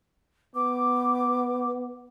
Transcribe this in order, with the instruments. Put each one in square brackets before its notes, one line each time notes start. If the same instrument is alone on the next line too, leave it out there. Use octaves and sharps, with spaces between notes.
[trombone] B3 [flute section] D6